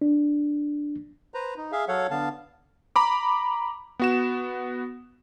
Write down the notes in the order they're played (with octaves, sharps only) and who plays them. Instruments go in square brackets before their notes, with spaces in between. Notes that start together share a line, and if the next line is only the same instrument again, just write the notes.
[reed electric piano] D4
[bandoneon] B4 C5 A#5
D#4
G#4 E5 F5
F#3 A4 C#5 F5 F#5
D3 B3 F5 A5
[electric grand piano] A#5 B5 D6
B3 F#4 E7